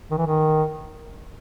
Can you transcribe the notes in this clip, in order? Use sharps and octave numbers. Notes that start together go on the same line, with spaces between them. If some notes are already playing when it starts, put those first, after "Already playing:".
D#3
E3
D#3